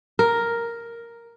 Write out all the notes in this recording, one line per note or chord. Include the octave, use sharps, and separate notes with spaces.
A#4